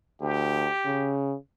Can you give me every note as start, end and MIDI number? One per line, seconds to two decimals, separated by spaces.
0.22 0.68 38
0.22 1.16 67
0.86 1.36 49